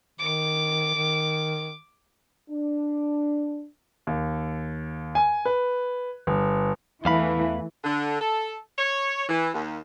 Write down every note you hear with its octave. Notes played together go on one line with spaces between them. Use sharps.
D#3 D6
D#3
D4
D#2
G#5
B4
G1
E2 E3 A3 F5 B5
D3
A4
C#5
E3
D#2